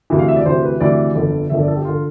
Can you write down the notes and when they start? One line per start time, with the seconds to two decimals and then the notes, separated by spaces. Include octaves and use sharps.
0.10 D2 C3 E3 E5
0.19 F5
0.28 E5
0.36 D5
0.46 D2 C3 E3 C5
0.63 B4
0.80 D2 C3 E3 D5
1.15 G1 F2 D3
1.50 G1 F2 D3 E5
1.60 D5
1.68 A4
1.76 G4
1.85 D3 F4